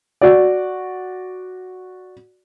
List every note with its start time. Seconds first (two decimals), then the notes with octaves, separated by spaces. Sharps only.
0.21 F#4 D5